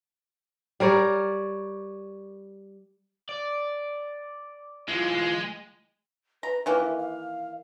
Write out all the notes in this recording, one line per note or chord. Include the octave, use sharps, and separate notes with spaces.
G3 A#4 C#5 D5
D5
E3 G#3 F4
B4 A#5
D#3 E3 A#3 E4
E5
F5